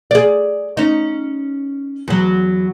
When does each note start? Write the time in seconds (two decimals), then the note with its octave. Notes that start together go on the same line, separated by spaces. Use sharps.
0.11 G#4 D5
0.77 C#4 D#4
2.08 E2 F#3